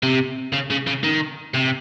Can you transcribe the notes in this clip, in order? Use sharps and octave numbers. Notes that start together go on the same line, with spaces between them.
C3
C#3
C#3
C#3
D#3
C3